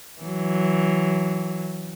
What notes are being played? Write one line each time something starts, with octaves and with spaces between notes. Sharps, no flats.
E3 F#3